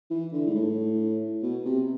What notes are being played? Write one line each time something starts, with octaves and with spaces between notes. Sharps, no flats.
E3
D3
G#2
A2
B2
C3